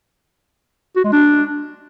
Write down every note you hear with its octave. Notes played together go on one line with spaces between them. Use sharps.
F#4
G#3
D4